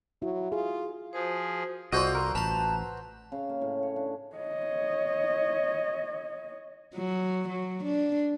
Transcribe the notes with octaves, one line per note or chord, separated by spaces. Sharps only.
F#3 E4 F#4
F4 G#4
F3 F#4 G#4 A#4 C5
C2 F4 F#4 A4 C5 D5 D#5
A#4
A1 B4 A5 A#5 C6
C#3
A#3
A2
C#5
D4
C#5 D#5
F#3
F#3
D4